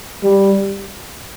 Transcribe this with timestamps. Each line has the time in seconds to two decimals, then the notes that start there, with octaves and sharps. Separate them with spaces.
0.24 G3